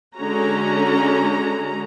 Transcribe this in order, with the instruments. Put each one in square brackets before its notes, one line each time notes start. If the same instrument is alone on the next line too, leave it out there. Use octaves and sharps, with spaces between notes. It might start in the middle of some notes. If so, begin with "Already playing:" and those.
[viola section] D3 G#3 C#4 F#4 A#5